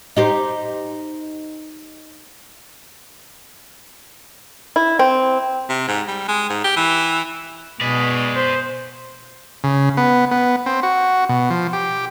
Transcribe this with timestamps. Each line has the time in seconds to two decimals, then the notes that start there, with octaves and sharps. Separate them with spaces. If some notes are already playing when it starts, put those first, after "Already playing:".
0.16 D#4 G4 C5
4.76 E4
4.99 C4
5.69 C3
5.88 G#2
6.08 G3
6.28 G#3
6.49 G#2
6.64 G4
6.76 E3
7.81 B2 G#3 B4 D5
8.36 C5
9.64 C#3
9.97 B3
10.31 B3
10.66 C4
10.83 F#4
11.29 B2
11.50 F3
11.73 G4